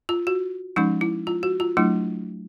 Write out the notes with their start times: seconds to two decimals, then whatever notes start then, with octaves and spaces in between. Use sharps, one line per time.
0.09 F4
0.27 F#4
0.76 F3 G#3 C#4 D#4
1.01 E4
1.27 F4
1.43 F#4
1.60 F4
1.77 F#3 A3 D4 E4